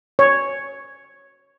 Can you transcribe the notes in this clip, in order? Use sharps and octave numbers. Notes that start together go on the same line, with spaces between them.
C#5